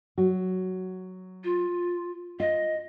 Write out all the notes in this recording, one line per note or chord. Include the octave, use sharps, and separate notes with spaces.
F#3 F#4
F4
F4 D#5